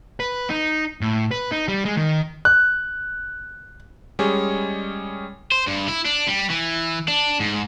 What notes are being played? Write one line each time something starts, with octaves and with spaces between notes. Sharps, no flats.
B4
D#4
A2
B4
D#4
G3
G#3
D#3
F#6
G3 G#3 C#4 G#4 C#5
C5
G2
E4
D4
G3
E3
D4
G#2